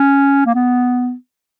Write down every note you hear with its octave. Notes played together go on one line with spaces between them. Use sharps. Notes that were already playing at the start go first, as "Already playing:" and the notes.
Already playing: C#4
A#3
B3